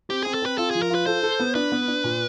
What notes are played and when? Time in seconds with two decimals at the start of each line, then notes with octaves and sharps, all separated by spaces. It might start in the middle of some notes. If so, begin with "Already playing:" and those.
0.10 C4 G4
0.22 C4 G#4
0.34 A4
0.42 C4 B4
0.58 F4 A4
0.71 F3 G#4
0.82 A#4
0.90 F4 B4
1.06 A4 C5
1.23 A4
1.39 B3
1.55 D4 B4
1.72 B3
1.88 D4
2.04 A#2